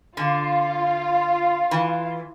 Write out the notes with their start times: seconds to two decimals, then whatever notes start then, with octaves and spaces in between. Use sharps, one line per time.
0.17 D3 F4
1.71 E3